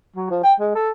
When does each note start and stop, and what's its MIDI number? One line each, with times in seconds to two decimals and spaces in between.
0.16 0.27 54
0.30 0.43 53
0.43 0.53 79
0.60 0.70 56
0.75 0.90 69